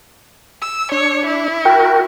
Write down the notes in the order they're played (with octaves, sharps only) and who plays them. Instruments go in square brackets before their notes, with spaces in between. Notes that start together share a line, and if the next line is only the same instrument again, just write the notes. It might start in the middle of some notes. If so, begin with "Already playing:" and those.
[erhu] E6
[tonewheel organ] D4 [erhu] C#5
[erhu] E4
[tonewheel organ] F#4 A#4 [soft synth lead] G5